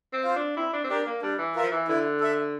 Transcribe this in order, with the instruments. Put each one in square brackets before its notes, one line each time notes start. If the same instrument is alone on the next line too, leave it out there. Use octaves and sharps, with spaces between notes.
[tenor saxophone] C4
[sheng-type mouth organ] F4 C5 F5
[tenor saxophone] D4
[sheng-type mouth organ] C4 [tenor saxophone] E4
[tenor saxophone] D4
C4
[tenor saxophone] D4 [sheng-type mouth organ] G4 A#4
[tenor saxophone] A#3
[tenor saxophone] G3 [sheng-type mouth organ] D4
[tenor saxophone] E3
[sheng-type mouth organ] F4 A#4 E5
[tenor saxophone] F3
E3
[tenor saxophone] D3 [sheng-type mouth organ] E4
[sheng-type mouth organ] A4 E5